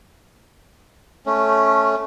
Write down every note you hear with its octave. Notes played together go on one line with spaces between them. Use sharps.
A3 C#4